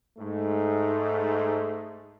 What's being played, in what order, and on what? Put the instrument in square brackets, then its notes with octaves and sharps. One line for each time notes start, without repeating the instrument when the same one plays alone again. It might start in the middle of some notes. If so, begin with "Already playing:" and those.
[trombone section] G#2 A3